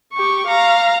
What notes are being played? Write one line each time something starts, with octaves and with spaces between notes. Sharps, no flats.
G4 C#6
F5 A#5